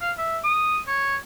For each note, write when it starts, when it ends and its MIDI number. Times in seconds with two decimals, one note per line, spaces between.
0.01 0.12 77
0.18 0.39 76
0.44 0.79 87
0.88 1.16 73